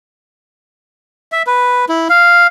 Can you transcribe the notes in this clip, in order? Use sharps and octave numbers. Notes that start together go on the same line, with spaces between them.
E5
B4
E4
F5